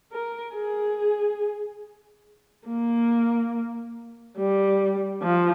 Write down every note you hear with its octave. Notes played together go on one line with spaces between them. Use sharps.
A#4
G#4
A#3
G3
F3